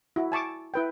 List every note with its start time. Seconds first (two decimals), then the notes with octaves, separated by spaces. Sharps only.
0.16 E4 F#4
0.32 G#5 A5 C#6 D6
0.74 E4 B4 G5